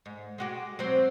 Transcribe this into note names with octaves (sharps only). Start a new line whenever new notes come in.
G#2
G#3 F#4 G4
F#3 C4